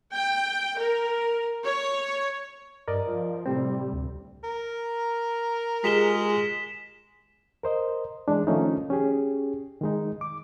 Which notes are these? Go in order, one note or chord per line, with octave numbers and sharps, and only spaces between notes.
G5
A#4
C#5
G2 A#4 D5 D#5
F3
A2 C3 G3 C4
D2
A#4
G#3 F4 G4 G#4 B6 E7 G7
A#4 C5 D#5
E3 G#3 D4
D#3 F3 A3 C#4 D#4
C#4 G4 G#4
D#3 G#3 D#4
D6